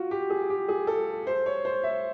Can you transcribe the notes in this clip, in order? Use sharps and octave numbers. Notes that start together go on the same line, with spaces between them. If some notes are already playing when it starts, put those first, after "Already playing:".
Already playing: F4 F#4
G4
G#4
G4
G#4
A4
C5
C#5
C5
E5